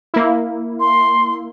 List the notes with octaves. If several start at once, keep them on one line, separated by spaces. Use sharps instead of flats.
A#3 E4
C6